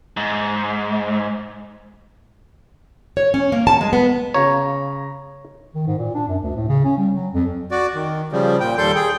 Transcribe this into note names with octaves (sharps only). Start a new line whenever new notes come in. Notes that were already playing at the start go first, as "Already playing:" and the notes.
G#2
C#5
C#4
A#3
A5
G#3
B3
C#3 C#5 F5 A#5
D#3
G#2
A#2
D4
F#2
D2
A2
C#3
C#4
G3
F#3
F2
F#4 D5
D#3
C#3 F3 G3
A#2 G5
D#2 G3 A4 C6 G6
G#4 G5